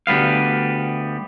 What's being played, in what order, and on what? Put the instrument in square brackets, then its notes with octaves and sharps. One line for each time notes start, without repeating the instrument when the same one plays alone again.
[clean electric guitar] D2 G3 B3 F5